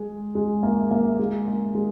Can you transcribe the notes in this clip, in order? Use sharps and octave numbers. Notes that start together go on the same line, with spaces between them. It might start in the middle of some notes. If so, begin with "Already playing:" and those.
Already playing: G#3
G#3
A#3
A#3
G#3
A#3
G#3